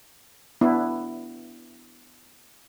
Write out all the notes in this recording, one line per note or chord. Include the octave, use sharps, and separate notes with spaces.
B3 D4 E4